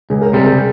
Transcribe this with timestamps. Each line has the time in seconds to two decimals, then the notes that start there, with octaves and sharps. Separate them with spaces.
0.10 C#2 G#4
0.22 A#4
0.33 C3 G3 G#4
0.45 A#4